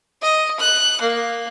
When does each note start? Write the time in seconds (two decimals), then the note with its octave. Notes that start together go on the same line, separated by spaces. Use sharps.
0.22 D#5
0.60 F#6
1.01 A#3